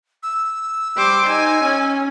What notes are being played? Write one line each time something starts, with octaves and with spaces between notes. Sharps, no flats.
E6
G3 C5 D6
D#4 G#5
C#4